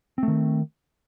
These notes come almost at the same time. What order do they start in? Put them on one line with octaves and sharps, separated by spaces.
C4 A3 D#3